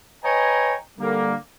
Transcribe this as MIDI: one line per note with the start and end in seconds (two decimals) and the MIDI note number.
0.24 0.75 71
0.24 0.75 73
0.24 0.75 75
0.24 0.75 79
0.24 0.75 80
0.24 0.75 82
0.99 1.34 50
0.99 1.34 55
0.99 1.34 58